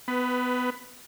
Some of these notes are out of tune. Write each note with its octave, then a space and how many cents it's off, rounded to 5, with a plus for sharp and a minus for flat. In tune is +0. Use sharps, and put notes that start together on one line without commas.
B3 +20 B4 +0